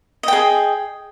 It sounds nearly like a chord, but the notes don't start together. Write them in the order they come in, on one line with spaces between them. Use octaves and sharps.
D#5 G5 G#4